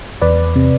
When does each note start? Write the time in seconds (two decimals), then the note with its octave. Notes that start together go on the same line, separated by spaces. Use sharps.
0.22 E2 B4 D5
0.56 C3